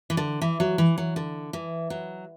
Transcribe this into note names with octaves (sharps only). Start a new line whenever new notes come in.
E3
D3
E3
F#3
E3
F#3
D3
E3
F#3